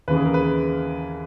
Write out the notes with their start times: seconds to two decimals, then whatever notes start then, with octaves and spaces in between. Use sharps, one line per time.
0.08 D#2 C#3 E3 B4
0.17 G#4
0.25 A#4
0.34 B4